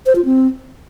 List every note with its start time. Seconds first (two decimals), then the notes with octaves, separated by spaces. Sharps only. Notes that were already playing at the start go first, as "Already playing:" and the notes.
0.06 C5
0.16 F4
0.25 C4